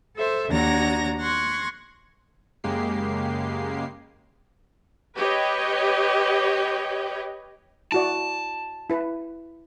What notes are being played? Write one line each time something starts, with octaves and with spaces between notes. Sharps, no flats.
A4 C5 E5
D#2 D4 F#4 A#5 G#6 A#6
C6 C#6 F#6 G#6 A#6
F#2 C#3 G#3 A#3 G4 C7
G4 B4 C#5 D#5 G5
E4 F#4 D5 A5
E4 B4